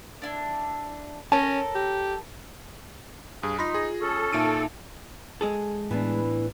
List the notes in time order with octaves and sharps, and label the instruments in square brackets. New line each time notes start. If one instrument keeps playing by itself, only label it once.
[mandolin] D4 E4
[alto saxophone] C#4 [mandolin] A4 A#4 A#5 [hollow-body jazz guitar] C#5 A5
[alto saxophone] G4
[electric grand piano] G2 [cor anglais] G#4
[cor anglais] D#4 [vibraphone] F4 [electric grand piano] B5 C6 A#6
[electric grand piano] G#4
[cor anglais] C#4 [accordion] A4
[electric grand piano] A#2 D7 D#7 [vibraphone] D#4 E5 A5
[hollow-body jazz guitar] G#3 G#4 A4
[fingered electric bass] A2 [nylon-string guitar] E3 B3 D4